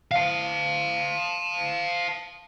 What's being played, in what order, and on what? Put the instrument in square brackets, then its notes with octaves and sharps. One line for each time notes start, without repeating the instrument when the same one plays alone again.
[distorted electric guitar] F5 A5